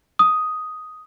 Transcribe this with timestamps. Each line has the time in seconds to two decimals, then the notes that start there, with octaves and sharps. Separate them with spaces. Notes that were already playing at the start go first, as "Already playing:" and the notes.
0.19 D#6